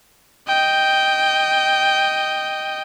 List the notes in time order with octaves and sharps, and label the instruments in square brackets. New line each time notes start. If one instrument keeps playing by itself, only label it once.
[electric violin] D#5 G5